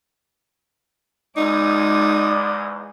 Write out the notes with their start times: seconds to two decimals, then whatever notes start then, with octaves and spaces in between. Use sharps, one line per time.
1.37 E2 G#2 G#3 D#4 D5 D6 D#6